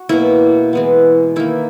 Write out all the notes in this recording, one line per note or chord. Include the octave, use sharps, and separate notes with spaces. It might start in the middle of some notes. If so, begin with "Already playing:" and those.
Already playing: F#4
B2 F#3 A#3 E4
E3 G#3 B3
D#3 A#3 E4